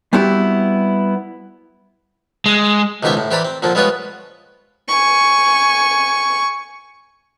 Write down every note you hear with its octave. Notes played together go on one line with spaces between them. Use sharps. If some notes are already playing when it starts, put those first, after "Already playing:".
G3 B3 C4 E4 F#4 G4
G#3
C#2 B2 D#3 G4 C5 E5
A2
E3 G4 C5 D5 A#5 B5
C4
A#2 D3 F3 C4
G3 G#3 B3 F4 B4 C#5
G#5 C#6